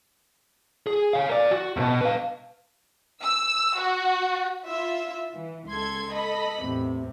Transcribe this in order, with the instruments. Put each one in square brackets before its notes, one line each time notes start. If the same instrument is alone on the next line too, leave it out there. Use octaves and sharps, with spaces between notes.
[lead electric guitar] G#4
C#5 F5
A#4 D5
F#4
E2 B2
B4 F5
[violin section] E6
F#4
[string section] E4 F4 E5
E3
C#2 A4 C6 G#6
A4 D#5 B5
E2 A2 C3